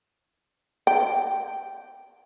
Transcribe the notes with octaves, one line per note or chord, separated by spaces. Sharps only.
G5